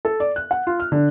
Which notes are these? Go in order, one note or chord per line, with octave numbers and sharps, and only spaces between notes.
A4
D5
F#6
F#5
F4
F6
D3